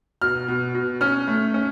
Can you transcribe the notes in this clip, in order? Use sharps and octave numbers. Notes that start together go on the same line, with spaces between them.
B2 F6
B2
B2
C#4 F6
A3
C#4